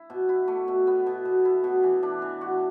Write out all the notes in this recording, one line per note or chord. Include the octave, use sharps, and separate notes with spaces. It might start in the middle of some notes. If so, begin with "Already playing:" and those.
Already playing: E4
B2
E4
A3
B2
B3
B2
B2
E4
B2
E3
D4
E3
F#4